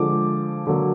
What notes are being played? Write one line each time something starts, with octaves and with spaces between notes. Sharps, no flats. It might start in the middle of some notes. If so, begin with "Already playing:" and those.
Already playing: D3 F3 G#3 D6
D3 F#3 A#3